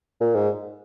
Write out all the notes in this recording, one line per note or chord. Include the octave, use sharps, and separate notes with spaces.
A#2
G#2